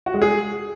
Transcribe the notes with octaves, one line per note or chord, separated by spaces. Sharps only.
F#4
G#3
G#4